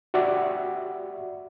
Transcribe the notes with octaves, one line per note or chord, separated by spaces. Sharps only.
F#4 G4 D5 E5 F#5